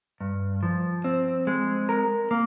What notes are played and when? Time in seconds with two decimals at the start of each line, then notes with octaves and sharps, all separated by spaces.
0.21 G2
0.63 F3
1.04 C4
1.47 G#3
1.89 A#4
2.31 A#3